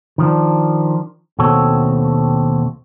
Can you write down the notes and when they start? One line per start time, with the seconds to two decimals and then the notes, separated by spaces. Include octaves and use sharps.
0.18 D#3 F3 D4
1.39 D#2 B2 C4 F#4 A4 C#5